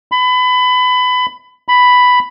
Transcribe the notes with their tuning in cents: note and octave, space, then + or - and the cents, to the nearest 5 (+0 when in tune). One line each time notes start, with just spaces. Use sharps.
B5 +25
B5 +5